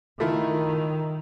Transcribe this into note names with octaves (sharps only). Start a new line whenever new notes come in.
D#3 A3 E4 F4